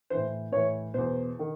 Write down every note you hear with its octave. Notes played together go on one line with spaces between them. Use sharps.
A2 E3 C5
A2 E3 C#5
E2 B2 C5
D#3